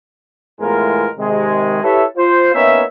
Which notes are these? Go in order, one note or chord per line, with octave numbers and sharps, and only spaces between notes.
E2 A2 G#3 B3 F4 A#4
C3 D#3 G#3
E4 G4 A4 B4 C#5 E5
F4 C5
A#3 B3 C#4 D#4 C#5 E5